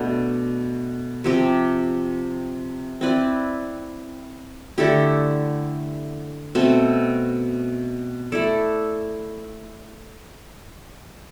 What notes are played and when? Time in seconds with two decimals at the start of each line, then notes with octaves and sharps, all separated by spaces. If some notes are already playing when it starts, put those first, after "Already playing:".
Already playing: B2 A3 D4
1.24 C3 F3 C4 G4
3.01 C4 E4 B4 D5
4.78 D3 A3 E4 G4
6.55 B2 A3 C4
8.32 A3 E4 A4 D5